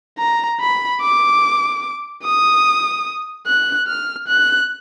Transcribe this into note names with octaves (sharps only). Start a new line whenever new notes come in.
A#5
B5
D6
D#6
F#6
F6
F#6